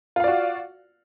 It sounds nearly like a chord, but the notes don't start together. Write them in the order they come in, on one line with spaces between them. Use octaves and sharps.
F4 F5 D5 F#4